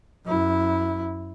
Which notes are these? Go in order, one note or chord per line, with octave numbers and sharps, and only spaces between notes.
F#2 E4